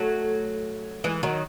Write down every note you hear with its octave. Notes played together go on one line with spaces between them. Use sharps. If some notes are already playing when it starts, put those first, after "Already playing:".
Already playing: F#3 A3
E3 G#3
D#3 F#3